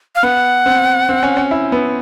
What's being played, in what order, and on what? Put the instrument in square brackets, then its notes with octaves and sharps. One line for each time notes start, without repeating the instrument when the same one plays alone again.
[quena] F5
[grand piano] B3 [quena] F#5
[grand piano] C4
C4
C#4
C#4
E4
B3